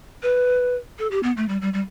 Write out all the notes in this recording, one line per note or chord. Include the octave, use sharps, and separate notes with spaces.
B4
A4
G4
B3
A3
G3
G3
G3